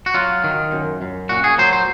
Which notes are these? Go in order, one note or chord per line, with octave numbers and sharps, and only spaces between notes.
F#4
F#3 F4
D#3
F#2
F#2
A#2 F#4
G#4
F#3 C5
C5